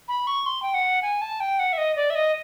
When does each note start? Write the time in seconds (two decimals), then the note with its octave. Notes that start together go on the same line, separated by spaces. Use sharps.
0.08 B5
0.27 C#6
0.46 C6
0.62 G5
0.74 F#5
1.02 G#5
1.21 A5
1.40 G5
1.59 F#5
1.73 E5
1.78 D#5
1.96 D5
2.10 E5
2.15 D#5